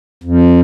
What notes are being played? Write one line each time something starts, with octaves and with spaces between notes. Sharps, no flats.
F2